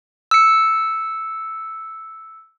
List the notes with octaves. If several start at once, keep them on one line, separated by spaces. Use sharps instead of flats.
E6 C#7